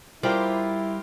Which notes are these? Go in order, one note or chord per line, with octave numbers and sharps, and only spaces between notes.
G3 E4 F4 G4 A#4 C5 D5